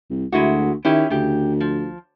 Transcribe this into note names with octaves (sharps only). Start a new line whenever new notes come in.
C2
D2 G#3 E4 F#4
D#3 C#4 E4 G4
D2 C#3 G4
F3